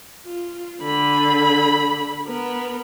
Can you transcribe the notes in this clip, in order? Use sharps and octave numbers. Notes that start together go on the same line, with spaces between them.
F4
D3 B5
B3 A#4